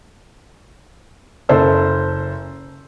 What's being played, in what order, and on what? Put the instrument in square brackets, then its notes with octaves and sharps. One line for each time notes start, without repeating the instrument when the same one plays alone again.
[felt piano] F#1 A4 C5 E6